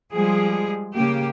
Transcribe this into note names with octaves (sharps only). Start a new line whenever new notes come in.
F3 G3 G#3 G#4
C#3 A#3 G4